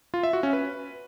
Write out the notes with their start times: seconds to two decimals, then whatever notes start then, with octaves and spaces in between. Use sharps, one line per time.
0.14 F4
0.23 E5
0.33 F#4
0.43 C#4
0.53 B4